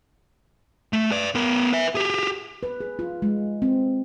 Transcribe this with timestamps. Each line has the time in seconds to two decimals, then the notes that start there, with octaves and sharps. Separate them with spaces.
0.93 A3
1.12 B4 D5
1.35 B3 A#4
1.73 B4 E5
1.95 G4 G#4
2.63 B4
2.80 G#4
2.99 F4
3.22 G#3
3.62 C4